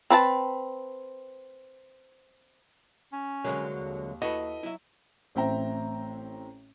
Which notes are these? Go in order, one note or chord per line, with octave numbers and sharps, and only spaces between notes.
C4 B4 C5 A5
C#4
C2 D3 F#3 G#3 A#3
D#2
E4 F#4 A4 B4 D#5
F#3 E4 E5
A1 A2 C4 E5 G5 A#5